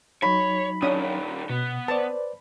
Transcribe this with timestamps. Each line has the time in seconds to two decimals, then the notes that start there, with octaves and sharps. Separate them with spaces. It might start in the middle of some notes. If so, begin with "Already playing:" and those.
0.22 F#3 D#4 C#5 B5
0.82 A#2 D#3 C#4 D4 D#6
1.50 B2 B3
1.88 B4 C5 D5 A5